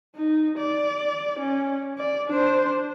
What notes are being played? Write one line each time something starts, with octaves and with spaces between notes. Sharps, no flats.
D#4
D5
C#4
D5
D4 C5